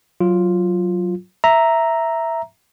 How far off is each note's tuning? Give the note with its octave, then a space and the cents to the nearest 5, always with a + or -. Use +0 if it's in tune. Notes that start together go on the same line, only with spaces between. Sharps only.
F#3 +0 F4 +0
E5 +0 A#5 +0